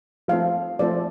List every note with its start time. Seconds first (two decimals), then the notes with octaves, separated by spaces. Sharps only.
0.28 F3 A3 C4 F5
0.79 F3 A3 C4 D5